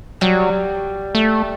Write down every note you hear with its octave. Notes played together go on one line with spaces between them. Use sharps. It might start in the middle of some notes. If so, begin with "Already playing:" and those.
F#3 G3
A3